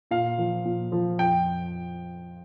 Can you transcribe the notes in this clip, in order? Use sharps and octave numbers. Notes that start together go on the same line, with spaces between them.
A#2 F5
F3
A#2
F3
F2 G5